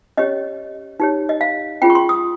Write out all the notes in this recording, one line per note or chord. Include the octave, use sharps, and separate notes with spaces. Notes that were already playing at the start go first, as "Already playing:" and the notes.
C#4 G4 C#5 D#5
D#4 G4 C#5
D#5
F5
C#4 F4 G#4 G5
C#6
C6
D#6